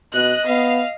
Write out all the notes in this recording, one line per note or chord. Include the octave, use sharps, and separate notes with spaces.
B2 D#5 F#6
B3 F5